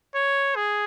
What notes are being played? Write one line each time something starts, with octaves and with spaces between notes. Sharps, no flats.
C#5
G#4